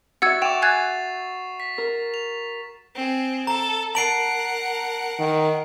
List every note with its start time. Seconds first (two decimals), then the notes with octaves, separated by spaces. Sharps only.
0.22 F#4 E5 F#5 E6 G#6 A6
0.42 F#5 G5 C#6 D6 E7 F7
0.62 G#5 F#6 G#6 A6 C7
1.60 B6
1.78 A#4
2.14 F7
2.95 C4 G#4
3.47 A4 A#5
3.95 A#4 F#5 A5 C7 D7 F#7
5.19 D#3